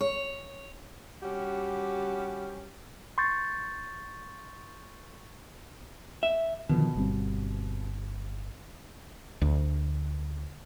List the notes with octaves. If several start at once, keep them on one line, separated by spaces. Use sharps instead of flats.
C#5
G3 C#4 F#4 G4
C6 C#6 G6 A6
E5
B2 D3 D#3 F3
G1 G3 C4
D2